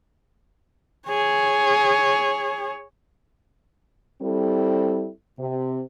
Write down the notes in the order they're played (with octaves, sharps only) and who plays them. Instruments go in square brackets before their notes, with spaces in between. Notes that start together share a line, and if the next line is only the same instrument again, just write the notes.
[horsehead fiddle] G#4 C#5
[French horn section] G3 C4 E4 A4
C3